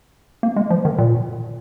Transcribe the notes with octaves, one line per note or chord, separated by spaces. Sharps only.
A#3
G#3
F3
D#3
A#2